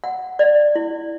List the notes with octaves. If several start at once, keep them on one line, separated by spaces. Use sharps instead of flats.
F#5
D5
E4